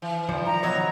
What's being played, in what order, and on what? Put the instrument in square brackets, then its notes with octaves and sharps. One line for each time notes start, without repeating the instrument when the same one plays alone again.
[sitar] E3
[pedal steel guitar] D#3 F3 [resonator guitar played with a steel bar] G3
[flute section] A#5
[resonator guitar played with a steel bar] B2 F#3 D#5 [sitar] C#5